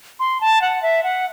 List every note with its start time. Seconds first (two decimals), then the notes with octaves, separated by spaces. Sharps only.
0.20 C6
0.41 A5
0.62 F#5
0.82 E5
1.03 F#5